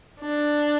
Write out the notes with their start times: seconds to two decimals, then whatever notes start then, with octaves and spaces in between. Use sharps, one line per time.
0.20 D4